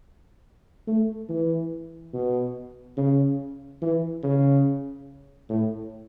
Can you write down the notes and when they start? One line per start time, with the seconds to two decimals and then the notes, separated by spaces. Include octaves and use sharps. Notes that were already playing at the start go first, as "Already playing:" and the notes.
0.87 A3
1.29 E3
2.13 B2
2.97 C#3
3.82 E3
4.23 C#3
5.49 A2